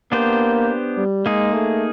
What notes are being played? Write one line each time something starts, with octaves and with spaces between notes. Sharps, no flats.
A#3 B3 D4 G4 C5
G3
G#3 A#3 D#4 G#4
A3